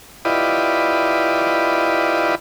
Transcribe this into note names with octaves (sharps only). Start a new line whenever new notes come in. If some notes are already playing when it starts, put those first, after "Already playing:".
E4 F4 G4 B4 D5 D#5